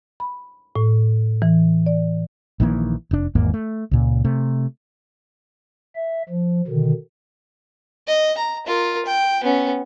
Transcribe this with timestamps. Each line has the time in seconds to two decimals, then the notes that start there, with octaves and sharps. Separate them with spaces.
0.20 B5
0.76 A2
1.42 E3
1.86 D5
2.60 A#1 D#3 E3 A#3
3.11 F1 D4
3.35 G#1 E2 G#2 A#3
3.54 A3
3.91 C#2 A#2
4.25 C3 A3
5.96 E5
6.29 F3
6.67 B2 D3 D#3
8.07 D#5
8.38 A#5
8.66 F4 A#4
9.05 G5
9.43 B3 C#4